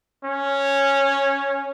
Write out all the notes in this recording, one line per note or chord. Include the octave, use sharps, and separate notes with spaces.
C#4